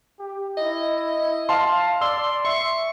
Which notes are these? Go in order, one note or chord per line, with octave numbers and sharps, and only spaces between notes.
G4
E4 D#5
D#5
F5 A5 C6
D5 C6 E6
E5 C6 C#6